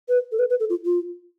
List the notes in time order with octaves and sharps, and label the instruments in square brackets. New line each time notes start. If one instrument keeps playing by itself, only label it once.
[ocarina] B4
A4
B4
B4
A4
F4
F4